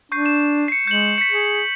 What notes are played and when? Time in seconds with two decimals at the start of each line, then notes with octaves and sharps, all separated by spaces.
0.12 D4 C#6 G6 C7
0.26 E7
0.68 C7 C#7
0.87 G#3 G6 C#7 F#7
1.18 B6 C#7
1.31 G#4